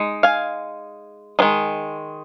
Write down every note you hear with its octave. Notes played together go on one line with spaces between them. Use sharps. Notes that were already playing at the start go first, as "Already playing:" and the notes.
Already playing: G#3 D#4
F5 G#5
D#3 G#3 C4 D#4